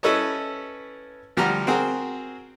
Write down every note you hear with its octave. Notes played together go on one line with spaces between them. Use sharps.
C#4 E4 A4 B4 C#5 D#5
D2 F3 G3 F#5 A#5 F6
C4 F#4 G#4 A#4 C5